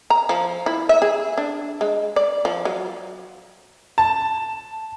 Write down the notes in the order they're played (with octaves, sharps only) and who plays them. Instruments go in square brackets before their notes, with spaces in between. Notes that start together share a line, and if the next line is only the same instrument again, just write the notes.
[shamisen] A#5
F3
E4
E5
G#4
D4
G#3
D5
F3
F#3
[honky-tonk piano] A5